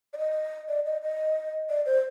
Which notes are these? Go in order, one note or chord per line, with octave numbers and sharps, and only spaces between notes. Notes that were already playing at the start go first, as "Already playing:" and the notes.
D5
D#5
D5
D#5
D#5
D5
C5